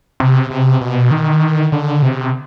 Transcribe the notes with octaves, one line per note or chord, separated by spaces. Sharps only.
C3
C3
B2
D#3
D3
C3